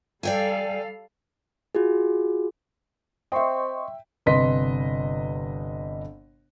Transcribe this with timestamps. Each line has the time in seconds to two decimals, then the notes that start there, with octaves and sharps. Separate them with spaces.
0.23 G3 A4 D5 F5 G5 G#5
1.75 F4 F#4 G#4
3.32 C4 D#5 E5 G5 C6 C#6
4.26 G1 C3 B4 D#5 C6 B6